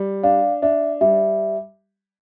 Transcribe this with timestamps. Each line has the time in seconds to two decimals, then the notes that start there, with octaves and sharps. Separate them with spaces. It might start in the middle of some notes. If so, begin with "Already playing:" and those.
Already playing: G3
0.23 D4 F5
0.62 D4 E5
1.01 G3 E5